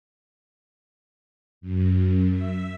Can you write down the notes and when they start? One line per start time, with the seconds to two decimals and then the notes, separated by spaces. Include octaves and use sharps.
1.61 F#2
2.31 E5